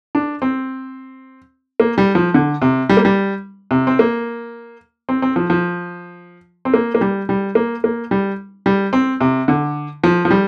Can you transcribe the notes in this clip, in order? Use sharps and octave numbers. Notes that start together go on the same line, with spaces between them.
D4
C4
A#3
G3
F3
D3
C3
G3
A#3
G3
C3
C4
A#3
C4
C4
F3
F3
C4
A#3
A#3
G3
G3
A#3
A#3
G3
G3
C4
C3
D3
F3
F3
G3